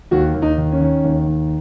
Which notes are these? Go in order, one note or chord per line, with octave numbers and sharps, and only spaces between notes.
D#2 F#4
D#2
D#4
D#3
C#4
D#3
D#2
D#3